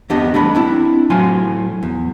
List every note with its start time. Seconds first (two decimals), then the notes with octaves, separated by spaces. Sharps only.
0.10 E2 B3 D4 G4 D#5
0.34 G3 A3 D4 B5
0.55 C4 D4 E4
1.10 A2 F#3 F4 G#5 C6
1.83 E2